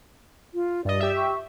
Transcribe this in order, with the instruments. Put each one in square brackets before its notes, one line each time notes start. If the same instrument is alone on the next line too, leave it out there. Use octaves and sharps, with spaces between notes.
[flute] F4
[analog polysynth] G2 D#5 [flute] D5
[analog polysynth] G4 E5
[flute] C#6